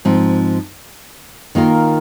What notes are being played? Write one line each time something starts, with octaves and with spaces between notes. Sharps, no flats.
G#2 F3 C4
D#3 A#3 F4 A#4